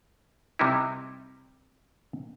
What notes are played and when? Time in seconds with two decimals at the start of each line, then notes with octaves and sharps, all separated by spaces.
0.59 C3 G3 D#4 E4